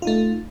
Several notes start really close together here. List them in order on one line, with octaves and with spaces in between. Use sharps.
F4 D#4 A3